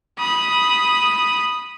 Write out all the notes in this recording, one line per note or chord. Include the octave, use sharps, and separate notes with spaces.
B5 D#6